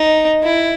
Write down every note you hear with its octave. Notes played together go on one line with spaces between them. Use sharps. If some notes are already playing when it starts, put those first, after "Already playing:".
Already playing: D#4
E4